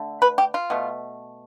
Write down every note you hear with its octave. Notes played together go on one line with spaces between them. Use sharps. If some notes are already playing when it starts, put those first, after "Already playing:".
Already playing: D3 A3
B4
G4
F4
B2 A3